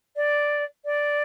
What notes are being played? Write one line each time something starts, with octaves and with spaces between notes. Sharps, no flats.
D5
D5